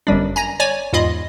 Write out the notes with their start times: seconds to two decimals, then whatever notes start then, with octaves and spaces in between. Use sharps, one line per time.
0.07 G1 F#2 G3 D4
0.36 G#5 A#5 A#6
0.60 C#5 D5 G#5
0.93 E2 G#2 F4 D#5 B5